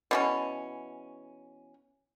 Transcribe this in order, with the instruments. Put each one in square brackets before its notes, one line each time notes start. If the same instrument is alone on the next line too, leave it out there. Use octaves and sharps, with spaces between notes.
[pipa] B2 E3 C#4